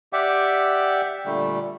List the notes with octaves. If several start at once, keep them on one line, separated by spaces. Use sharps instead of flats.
G4 D5 E5 F#5 G5 D6
A#2 D3 G3 A3